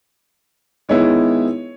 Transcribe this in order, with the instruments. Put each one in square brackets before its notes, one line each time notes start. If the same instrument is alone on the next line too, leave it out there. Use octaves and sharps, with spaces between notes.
[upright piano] D#3 G#3 B3 E4 C#5